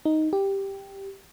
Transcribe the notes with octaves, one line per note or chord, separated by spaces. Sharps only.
D#4
G4